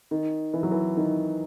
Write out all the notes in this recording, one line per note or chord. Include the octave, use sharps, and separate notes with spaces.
D#3
E3
F#3
E3
D#3